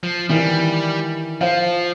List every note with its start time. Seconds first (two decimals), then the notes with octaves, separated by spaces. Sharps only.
0.03 F3
0.29 D#3 E3 G3
1.41 F3 C5 F5